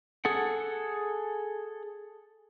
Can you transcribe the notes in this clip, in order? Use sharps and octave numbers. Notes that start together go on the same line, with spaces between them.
G#4 A4 F#5